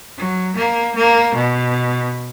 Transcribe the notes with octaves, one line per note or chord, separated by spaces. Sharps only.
F#3
A#3
A#3
B2